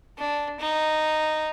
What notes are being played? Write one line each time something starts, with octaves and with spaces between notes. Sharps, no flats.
D4
D#4